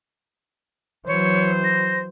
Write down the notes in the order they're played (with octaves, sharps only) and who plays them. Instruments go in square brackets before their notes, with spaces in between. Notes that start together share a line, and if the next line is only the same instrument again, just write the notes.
[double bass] E3 F#3 [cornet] C5 [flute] C#5
[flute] A#6